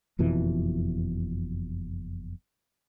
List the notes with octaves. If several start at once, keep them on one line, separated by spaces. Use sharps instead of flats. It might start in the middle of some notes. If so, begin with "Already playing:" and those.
F#1 F2 B2 E3